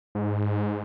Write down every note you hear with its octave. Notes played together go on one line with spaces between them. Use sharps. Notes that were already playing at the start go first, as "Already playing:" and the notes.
G#2